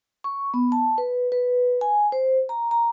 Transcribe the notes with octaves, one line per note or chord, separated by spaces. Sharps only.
C#6
B3
A5
B4
B4
G#5
C5
A#5
A#5